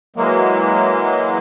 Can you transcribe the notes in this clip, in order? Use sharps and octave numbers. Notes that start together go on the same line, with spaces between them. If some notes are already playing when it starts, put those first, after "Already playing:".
E3 F#3 G#3 A#3